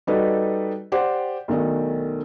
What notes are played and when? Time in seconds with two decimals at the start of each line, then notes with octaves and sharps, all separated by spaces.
0.07 G3 D#4 F#4 A4 B4 D#5
0.92 G4 C5 D5 F#5 G5
1.48 B1 D#3 A3 D4 A4 D#5